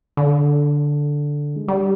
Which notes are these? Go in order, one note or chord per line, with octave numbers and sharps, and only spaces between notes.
D3
G#3
G3